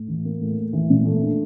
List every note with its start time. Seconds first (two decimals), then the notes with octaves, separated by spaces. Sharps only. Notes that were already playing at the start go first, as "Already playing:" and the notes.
Already playing: A2
0.08 E3
0.25 A#3
0.41 A2
0.57 A2
0.73 E3
0.90 A#2
1.05 A3
1.22 D4